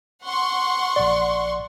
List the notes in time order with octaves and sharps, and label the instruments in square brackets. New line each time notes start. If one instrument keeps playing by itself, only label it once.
[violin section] F#5 C6 C#6
[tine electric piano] A#1 D5